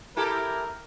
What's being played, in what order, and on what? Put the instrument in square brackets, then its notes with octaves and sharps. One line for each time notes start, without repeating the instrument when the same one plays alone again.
[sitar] E4 G4 A4 [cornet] A#4